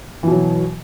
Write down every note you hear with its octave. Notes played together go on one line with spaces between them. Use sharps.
B2 E3 F#3